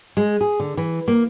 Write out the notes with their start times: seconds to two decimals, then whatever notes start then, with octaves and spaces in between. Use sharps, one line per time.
0.17 G#3
0.41 G#4
0.60 D3
0.77 E3
1.08 A#3